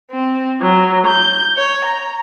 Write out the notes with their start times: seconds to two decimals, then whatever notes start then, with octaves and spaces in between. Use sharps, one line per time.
0.10 C4
0.63 F#3
1.08 G6
1.56 C#5
1.85 A#5